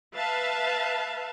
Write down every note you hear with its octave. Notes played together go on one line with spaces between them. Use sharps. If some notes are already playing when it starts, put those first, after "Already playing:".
B4 E5 F5 A5